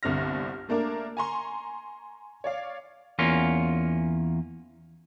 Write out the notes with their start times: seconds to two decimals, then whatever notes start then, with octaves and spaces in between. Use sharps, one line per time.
0.03 G1 C2 D3 C4 F6 A#6
0.69 A3 A#3 D4 A#4
1.17 G#5 A#5 C6 C#6
2.44 C#5 D5 F5
3.19 E2 A#3 C#4 F4